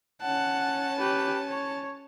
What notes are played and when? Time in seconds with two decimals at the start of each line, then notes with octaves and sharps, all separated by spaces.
0.22 C#4 F#5 A5
0.99 G4 B4
1.49 C#5